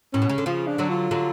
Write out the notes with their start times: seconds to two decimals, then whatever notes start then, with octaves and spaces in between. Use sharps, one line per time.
0.13 A2 C#4
0.22 B2
0.29 C#3
0.38 D3
0.46 C#3 F3 F4
0.67 D4
0.78 D3 F#3
0.89 F4
1.11 D3 F#3